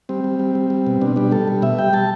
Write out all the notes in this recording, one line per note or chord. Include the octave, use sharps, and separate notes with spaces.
G3 C4
G3
G3
G3
G3
B2
B2 D4
G3 D4
G3 A4
G3
B2 E5
G3 G5
G3 A5